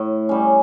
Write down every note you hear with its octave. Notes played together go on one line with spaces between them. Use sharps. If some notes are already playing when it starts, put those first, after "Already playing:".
Already playing: A2
G3 C#4